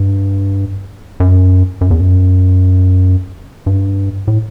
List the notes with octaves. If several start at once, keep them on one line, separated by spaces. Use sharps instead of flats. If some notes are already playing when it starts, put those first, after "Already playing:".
Already playing: G2
F#2
F#2
E2
F#2
G2
A2